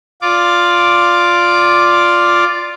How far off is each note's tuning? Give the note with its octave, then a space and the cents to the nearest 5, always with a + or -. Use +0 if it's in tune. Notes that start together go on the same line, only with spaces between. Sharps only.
F4 +0 D5 +0 D6 +0